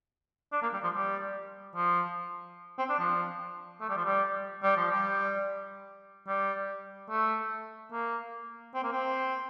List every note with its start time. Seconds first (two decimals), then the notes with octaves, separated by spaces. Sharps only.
0.52 D4
0.62 A#3
0.73 G3
0.83 F3
0.93 G3
1.76 F3
2.78 C4
2.89 D4
2.99 F3
3.81 A3
3.89 G3
3.97 F3
4.05 G3
4.63 G3
4.77 F3
4.91 G3
6.28 G3
7.10 A3
7.92 A#3
8.75 C4
8.83 A#3
8.92 C4